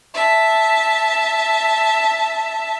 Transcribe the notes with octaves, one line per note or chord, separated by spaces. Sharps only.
E5 A5